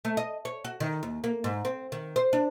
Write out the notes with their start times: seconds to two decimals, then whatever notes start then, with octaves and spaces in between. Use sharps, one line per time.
0.05 A3
0.17 D#5
0.45 C#5
0.65 F#4
0.80 D#3
1.03 D#2
1.24 A#3
1.44 G#2
1.65 C4
1.92 D#3
2.16 C5
2.33 D4